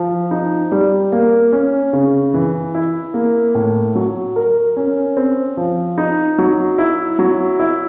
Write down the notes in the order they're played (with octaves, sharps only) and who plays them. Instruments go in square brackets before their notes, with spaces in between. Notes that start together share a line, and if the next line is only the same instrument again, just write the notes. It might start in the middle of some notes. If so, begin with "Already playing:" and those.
Already playing: [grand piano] F3
D#4
G3
A#3
C#4
C#3
E3
E4
A#3
A2
F#3
A#4
C#4
C4
F3
D#4
F#3
E4
F#3
E4